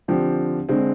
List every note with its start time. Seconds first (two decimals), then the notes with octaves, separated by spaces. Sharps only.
0.08 D3 F3 C4 G4
0.69 D3 G#3 C4